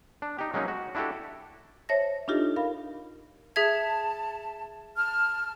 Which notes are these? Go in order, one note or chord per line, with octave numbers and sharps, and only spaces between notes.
D4
D#4 G4
F#3 G#3 A#3 C#4 D#4
F#4
D4 E4 F#4 G4 A4
C5 C#5 E5 A5 A#6
D4 D#4 F4 G4 A4 D#5
A#4 F5 B5
G#4 E5 A5 G#6
A5 F6